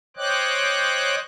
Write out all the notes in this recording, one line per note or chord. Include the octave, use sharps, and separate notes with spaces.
C5 C#5 D#5 G5 D6 F#6